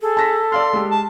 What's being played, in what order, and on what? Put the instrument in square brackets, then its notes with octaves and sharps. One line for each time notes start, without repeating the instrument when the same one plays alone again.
[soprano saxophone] G#4 [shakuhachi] A4
[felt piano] A5 A#6 B6
[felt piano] D5 F5 F6 [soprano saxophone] C6
[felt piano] G#3 G4
[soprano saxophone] A5